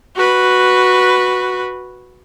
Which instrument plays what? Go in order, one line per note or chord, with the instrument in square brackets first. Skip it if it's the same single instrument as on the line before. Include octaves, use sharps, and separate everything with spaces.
[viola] F#4 B4